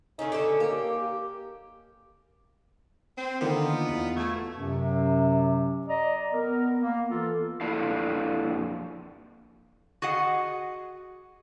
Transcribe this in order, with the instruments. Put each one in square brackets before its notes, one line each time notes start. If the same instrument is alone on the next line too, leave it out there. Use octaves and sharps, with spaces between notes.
[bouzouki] C#3 A3 C#4 [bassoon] D#4
[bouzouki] D3 C#4 A4
[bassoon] A#3 [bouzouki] G4
[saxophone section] C4
[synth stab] D3 D#3 A#3 [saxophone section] B3 D#4 F4
[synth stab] E2
[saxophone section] B2 A3 [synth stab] C#6 G#6
[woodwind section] F#2 C3 F#3
D5 D#5 A#5
B3 A#4
A#3
E3 F4 A4
[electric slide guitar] F2 A#3 D4 E4 A4 F5
[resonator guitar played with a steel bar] F#4 G#4 D#5 F#5